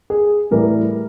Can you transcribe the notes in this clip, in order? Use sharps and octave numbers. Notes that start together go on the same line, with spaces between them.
G#4
A2 E3 G3 A#4